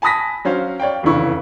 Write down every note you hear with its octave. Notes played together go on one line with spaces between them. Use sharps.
G#5 A5 B5 D#6 A#6 B6
F#3 C#4 C5 F5
C#5 D5 F5 G5
F1 E2 C#3 E4 C#6